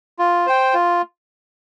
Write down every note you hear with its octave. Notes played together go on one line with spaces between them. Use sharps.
F4
C5 G5
F4